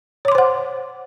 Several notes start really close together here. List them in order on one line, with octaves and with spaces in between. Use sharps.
C#5 D6 C6 C5 F#5